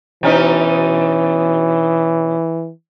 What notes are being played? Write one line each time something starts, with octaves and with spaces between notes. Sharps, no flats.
B2 E3 C#4 D#4